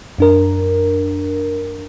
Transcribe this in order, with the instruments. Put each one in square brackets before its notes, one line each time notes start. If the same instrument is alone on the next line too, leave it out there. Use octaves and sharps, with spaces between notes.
[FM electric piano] F#2 D4 A#4